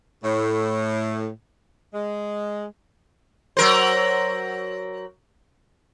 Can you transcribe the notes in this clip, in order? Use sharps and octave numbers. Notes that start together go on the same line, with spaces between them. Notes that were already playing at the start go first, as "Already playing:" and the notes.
A2
G#3
F#3 A#4 C5